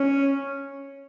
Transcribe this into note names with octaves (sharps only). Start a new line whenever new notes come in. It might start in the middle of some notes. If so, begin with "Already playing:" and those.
Already playing: C#4